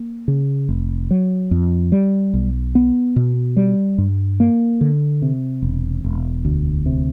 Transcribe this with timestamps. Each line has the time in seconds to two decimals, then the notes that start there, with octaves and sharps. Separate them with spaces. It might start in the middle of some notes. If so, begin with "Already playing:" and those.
Already playing: A#3
0.28 C#3
0.69 F1
1.11 F#3
1.51 F2
1.92 G3
2.34 B1
2.75 B3
3.16 B2
3.57 G3
3.98 G2
4.40 A#3
4.81 D3
5.22 C3
5.62 E1
6.04 E1
6.45 D2
6.86 C3